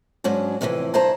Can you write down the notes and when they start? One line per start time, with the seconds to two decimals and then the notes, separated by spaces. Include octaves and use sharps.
0.24 G#2 F#3 C#4 D4
0.61 F2 A2 C3 D#3 E3
0.94 G2 E4 C5 A5 A#5